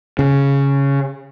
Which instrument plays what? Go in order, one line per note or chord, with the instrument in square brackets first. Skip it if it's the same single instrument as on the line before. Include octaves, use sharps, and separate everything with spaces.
[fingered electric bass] C#3